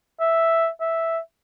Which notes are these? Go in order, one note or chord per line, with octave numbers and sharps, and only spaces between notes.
E5
E5